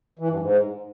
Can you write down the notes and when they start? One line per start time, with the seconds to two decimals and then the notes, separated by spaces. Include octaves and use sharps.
0.19 E3
0.29 G2
0.40 G#2